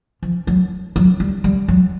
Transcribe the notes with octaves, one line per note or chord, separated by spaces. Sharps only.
F3
F#3
F#3
G3
G3
F#3